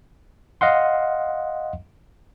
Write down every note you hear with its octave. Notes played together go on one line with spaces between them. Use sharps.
D#5 F5 F#5 C6